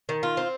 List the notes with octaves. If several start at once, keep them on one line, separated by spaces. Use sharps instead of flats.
D#3
F4
C4